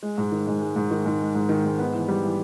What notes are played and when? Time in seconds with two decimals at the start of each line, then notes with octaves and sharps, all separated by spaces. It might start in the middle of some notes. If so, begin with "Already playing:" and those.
0.03 G#3
0.18 G#2
0.32 D#3
0.47 G#2
0.62 G#3
0.76 G#2
0.91 D#3
1.06 G#2
1.21 G#3
1.35 G#2
1.49 D#3
1.65 G#2
1.79 B3
1.94 E3
2.08 G3
2.23 E3